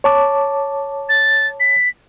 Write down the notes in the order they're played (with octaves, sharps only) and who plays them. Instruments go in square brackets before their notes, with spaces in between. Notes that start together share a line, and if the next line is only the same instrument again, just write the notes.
[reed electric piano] C#5 A5 D6
[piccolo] A6
B6